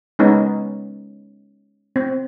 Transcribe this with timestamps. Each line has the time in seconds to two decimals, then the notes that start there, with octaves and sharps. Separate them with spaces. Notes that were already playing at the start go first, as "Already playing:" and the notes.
0.19 G#3 B3 C#4 D#4
1.96 C4